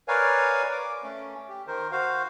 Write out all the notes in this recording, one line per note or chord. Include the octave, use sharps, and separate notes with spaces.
A#4 B4 C#5 D5 F5 G#5
D6
A3 C#4
G4
D#3 A#4 C5
F#4 C5 F5